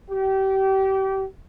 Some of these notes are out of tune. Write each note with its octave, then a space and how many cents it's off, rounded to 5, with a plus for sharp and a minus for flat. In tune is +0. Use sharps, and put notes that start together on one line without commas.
G4 -30